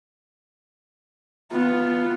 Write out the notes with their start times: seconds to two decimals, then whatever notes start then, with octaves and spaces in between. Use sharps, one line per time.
1.52 B3 F4